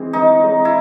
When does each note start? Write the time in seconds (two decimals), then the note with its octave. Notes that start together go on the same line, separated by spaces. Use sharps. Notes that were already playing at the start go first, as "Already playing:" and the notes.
Already playing: E3 G#3 C4
0.13 E3 D#4
0.40 G#3 C4
0.65 E4